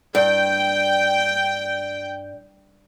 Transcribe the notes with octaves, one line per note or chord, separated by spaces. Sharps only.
G2 G5